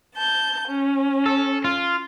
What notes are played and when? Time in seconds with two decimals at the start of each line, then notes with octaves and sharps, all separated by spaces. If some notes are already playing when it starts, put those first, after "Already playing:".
0.15 A5 G6
0.68 C#4
1.26 A4
1.64 F4